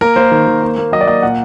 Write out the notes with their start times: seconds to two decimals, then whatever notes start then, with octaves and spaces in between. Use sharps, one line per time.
0.01 A#3 A#4
0.16 A#3 C5
0.31 D#3
0.47 D#3
0.63 A#3
0.78 A#3
0.92 F#3 D#5
1.01 D5
1.08 A#3 D#5
1.22 A#2 F#5